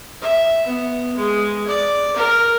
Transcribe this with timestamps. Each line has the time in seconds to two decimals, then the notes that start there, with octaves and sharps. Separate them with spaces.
0.22 E5
0.66 B3
1.16 G#3
1.67 D5
2.16 A#4